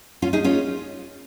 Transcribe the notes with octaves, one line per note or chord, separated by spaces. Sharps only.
C#4 F4
D#4 G#4
C#4 F4